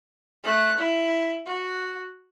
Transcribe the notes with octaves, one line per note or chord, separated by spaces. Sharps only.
A3 F#6
E4
F#4